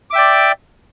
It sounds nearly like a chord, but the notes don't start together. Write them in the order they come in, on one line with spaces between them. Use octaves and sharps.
D6 E5 G5 D5